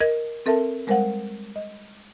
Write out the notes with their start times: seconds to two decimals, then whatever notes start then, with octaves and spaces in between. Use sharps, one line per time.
0.01 A#4 D#5 G#6
0.46 C4 A4 A#4 E5 A5
0.87 G3 G#3 A#4 C5 F5 F#5
1.56 D#5